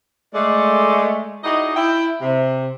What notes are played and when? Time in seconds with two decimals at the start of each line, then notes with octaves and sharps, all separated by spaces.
0.34 G#3 A3 D5
1.43 D#4 E4 F#4 G#4 D5 D#5
1.76 E4 G5
2.21 C3